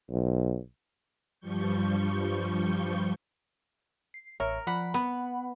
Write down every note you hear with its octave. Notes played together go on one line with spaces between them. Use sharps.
B1
G2 F3 G3 C#6 G6
C7
A1 A#4 C#5 E5
F3 D5 F#5 B5
B3 F#5 B5